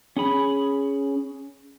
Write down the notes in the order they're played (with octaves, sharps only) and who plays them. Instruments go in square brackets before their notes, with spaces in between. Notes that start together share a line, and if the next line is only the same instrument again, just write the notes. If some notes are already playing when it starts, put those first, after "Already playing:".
[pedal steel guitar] C#4 G#4 B5